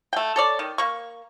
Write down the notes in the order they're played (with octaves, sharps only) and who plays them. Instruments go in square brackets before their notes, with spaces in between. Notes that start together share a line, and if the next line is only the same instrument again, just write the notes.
[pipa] A3 G5
A4 C#5 D5
D#3
A#3 C#6